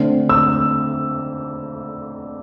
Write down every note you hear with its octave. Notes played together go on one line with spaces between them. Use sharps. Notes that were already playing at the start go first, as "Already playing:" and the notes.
Already playing: D3 A3 C4
E6